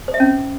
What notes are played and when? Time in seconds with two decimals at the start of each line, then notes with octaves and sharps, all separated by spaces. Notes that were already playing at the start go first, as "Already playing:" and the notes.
0.08 C5
0.14 E5
0.20 C#4